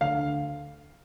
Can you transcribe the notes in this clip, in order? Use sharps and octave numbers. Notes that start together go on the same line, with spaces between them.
D2 F5